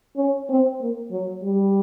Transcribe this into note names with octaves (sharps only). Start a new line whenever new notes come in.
C#4
C4
A#3
F#3
G3